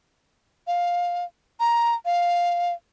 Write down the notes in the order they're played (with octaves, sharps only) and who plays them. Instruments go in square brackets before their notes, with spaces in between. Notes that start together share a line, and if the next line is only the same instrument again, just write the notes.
[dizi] F5
A#5
F5